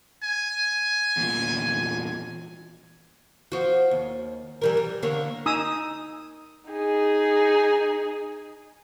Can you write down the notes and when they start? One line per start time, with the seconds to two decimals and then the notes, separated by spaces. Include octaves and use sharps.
0.24 G#5
1.17 E2 A#2
3.52 F3 F#4
3.91 D#2
4.61 E3 G3 A#4
4.77 G3
5.03 D3 A#3 C#5
5.46 D#4 G#5 A#5 D#6 E6
6.70 D#4 G#4